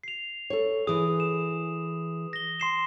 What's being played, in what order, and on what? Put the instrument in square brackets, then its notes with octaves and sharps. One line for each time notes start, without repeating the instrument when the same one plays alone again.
[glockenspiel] C7 F7
[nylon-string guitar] A4 C#5
[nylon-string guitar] E3 G#4 [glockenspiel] D#6
[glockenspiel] E7
A#6 G7
C6 C7 E7